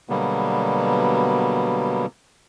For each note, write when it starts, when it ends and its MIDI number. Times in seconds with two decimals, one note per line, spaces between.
0.09 2.06 47
0.09 2.06 50
0.09 2.06 54
0.09 2.06 55
0.09 2.06 58
0.09 2.06 59